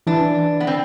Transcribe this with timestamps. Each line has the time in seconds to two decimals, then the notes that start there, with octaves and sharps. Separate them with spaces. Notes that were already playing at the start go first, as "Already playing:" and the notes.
0.07 E3 D4
0.60 B3
0.67 C4